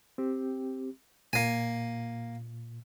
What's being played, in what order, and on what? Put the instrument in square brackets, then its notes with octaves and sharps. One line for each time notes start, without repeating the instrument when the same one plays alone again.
[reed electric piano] C4 G4
[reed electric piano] A#2 [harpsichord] A#3 G#5